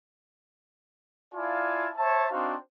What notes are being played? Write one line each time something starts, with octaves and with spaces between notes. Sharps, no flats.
E4 F4 D5 F5 G#5 A5
C5 C#5 E5 A5
C4 D4 D#4 F#4 C5 F5